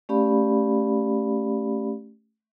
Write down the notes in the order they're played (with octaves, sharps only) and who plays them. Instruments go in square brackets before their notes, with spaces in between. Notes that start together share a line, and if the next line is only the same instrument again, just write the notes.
[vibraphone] A3 C#4 G4 D5 F5 B5